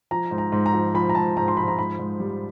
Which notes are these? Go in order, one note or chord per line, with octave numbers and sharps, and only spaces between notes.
F3 A#5
G#2
A#5
G#2
A#5
F3
F3 B5
A#5
G#2 A5
G#2 A#5
C6
F3 B5
A#5
G#2 B5
G#2
G3